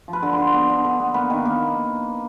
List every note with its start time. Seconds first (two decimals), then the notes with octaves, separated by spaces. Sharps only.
0.08 F3
0.13 B4
0.23 D3
0.33 C5
0.38 D3
0.53 B3
0.69 D3
0.85 D3
1.00 B3
1.14 A#3 B4
1.30 D#3
1.45 A#3